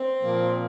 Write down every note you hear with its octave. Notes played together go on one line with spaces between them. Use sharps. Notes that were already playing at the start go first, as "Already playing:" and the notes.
Already playing: C4
A#2 F3 A#3